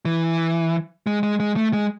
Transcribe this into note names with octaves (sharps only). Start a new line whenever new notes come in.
E3
G#3
G#3
G#3
A3
G#3